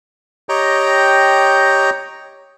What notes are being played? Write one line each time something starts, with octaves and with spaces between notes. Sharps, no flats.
G4 C#5 D#5 G5 A#5